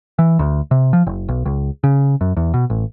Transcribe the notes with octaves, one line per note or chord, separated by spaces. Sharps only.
E3
D2
C3
F3
F#1
B1
C#2
C#3
F#2
E2
B2
A1